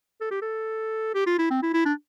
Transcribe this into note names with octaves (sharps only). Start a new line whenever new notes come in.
A4
G4
A4
G4
F4
E4
C4
E4
E4
D4